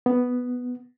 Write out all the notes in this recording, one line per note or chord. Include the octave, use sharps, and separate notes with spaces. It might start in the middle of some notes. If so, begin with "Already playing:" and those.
B3